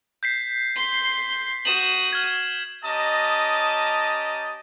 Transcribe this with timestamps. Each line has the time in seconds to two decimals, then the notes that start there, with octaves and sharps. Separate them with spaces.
0.23 G6 B6 C7
0.76 C6
1.65 F#4 D#6 E7 F#7
2.13 F6 G#6
2.84 C#4 G4 D#5 A5 A#5 D#6